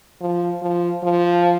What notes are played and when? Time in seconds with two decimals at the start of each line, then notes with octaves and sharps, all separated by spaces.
0.21 F3
0.62 F3
1.03 F3